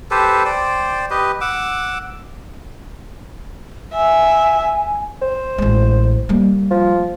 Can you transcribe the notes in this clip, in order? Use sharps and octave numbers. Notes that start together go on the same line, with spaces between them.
G4 A4 B4 C5
C5 D5 G5
G4 B4 D#5
F#5 D6 E6
E5 G#5
C5
A1 G#3
G3 A#3
F3